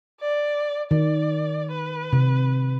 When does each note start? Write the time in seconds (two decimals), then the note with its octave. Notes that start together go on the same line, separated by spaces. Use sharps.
0.21 D5
0.91 D#3 D5
1.72 B4
2.13 C3